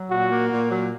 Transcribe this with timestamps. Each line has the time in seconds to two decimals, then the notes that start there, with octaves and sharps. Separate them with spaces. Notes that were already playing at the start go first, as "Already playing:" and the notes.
Already playing: F#3
0.10 A#2 F#4
0.30 A#3
0.50 A#2
0.70 F#3